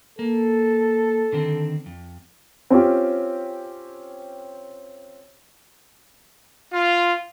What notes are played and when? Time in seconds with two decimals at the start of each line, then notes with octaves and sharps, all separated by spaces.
0.19 A#3 A4
1.33 D3 D#3 C4
1.86 F2
2.70 C4 C#4 F4 G4
6.72 F4